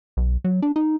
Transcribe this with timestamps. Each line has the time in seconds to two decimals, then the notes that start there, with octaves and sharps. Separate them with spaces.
0.17 B1
0.44 F#3
0.62 D4
0.76 D#4